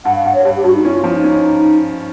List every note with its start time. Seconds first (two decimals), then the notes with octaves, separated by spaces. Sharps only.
0.05 G2 F#5
0.15 F5
0.25 G2 F#5
0.34 C#5
0.45 G2 G4
0.55 G4
0.64 G2 F#4
0.75 D#4
0.84 C#4 E4
0.94 F4
1.04 F3 E4
1.14 D#4
1.24 C#4